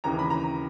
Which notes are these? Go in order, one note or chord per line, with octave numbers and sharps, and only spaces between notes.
D#2 C#3 E3 A#5
B5
A#5